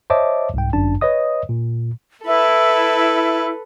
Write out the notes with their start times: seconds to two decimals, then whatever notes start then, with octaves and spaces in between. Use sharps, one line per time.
0.10 C5 C#5 D#5 E5 A5 D6
0.54 C2 G#2 G5
0.73 G1 F#2 D4 A5
1.01 B4 C#5 D#5 D#6
1.49 A#2
2.24 E4 A4 B4